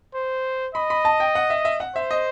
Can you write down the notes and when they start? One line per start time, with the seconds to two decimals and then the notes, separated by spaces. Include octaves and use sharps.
0.14 C5
0.75 D#5 B5
0.90 B5
1.05 A5
1.20 G5
1.35 F#5
1.50 E5
1.65 E5
1.80 F#5
1.96 C5 E5
2.11 D#5